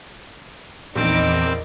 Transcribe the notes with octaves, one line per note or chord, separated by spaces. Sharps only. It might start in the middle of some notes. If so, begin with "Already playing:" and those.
A#1 E2 C4 D#4 A#4 B5 D6